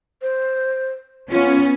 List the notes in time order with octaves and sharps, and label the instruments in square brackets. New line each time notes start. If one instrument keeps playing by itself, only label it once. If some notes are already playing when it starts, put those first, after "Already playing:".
[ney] C5
[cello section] B3 C#4 [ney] F4